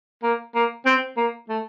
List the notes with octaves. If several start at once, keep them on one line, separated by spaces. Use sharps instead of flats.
A#3
A#3
C4
A#3
A3